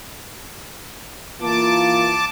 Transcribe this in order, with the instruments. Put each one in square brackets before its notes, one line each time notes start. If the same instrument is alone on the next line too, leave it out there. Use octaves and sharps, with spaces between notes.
[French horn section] E3 A#3 F4 [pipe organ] A5 D6